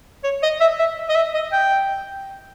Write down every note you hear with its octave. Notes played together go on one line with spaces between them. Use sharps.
C#5
D#5
E5
E5
D#5
E5
D#5
G5